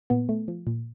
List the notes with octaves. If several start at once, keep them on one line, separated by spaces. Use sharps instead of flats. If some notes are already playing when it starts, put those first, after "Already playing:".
A#2 B3
A3
F3
A#2